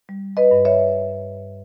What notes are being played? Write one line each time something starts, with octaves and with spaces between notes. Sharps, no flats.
G3
B4 D#5
G2
C#5 E5